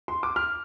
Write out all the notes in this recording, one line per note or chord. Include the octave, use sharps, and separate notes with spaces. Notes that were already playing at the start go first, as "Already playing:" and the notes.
C6
D6
F6